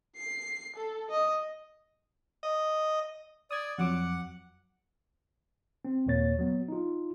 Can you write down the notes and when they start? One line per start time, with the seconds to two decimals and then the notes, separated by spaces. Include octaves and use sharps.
0.17 C7
0.76 A4
1.10 D#5
2.43 D#5
3.51 D5 D#6 G#6
3.78 F2 F#3 F#5 D6
5.85 C4
6.06 D#2 A#2 A#3 C#5 A6
6.39 F#3 B3
6.68 D#4 F4